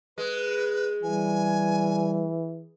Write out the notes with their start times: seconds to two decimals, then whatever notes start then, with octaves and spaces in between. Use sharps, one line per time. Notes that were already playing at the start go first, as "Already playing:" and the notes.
0.18 G#3 B4
1.03 E3 G3 G#5